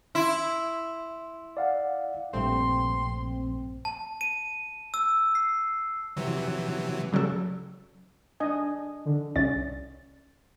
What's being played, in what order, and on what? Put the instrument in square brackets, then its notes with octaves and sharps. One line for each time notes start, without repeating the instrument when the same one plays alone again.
[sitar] E4 [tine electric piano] C6
[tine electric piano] D5 F5 F#5
[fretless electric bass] A#1 [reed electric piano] G2 A3 G5 [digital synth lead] C4 [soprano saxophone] C6
[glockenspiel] A5
D#7
E6
C7
[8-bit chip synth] C3 E3 F#3
[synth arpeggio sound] C#3 F#3 G3 A4
[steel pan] D4 D#5 G#5
[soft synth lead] D3
[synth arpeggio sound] C2 C#4 D5 A6